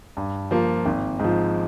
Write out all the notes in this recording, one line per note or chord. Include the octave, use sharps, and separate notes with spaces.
G2
F3 A#3 F4
G#1
G#2 F3